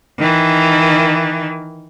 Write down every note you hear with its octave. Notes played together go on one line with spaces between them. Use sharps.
D#3 E3